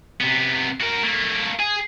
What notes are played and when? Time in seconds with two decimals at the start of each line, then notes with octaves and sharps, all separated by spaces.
0.21 C3 B3
0.81 F#4 A#4
1.03 A3 A#3
1.59 G#4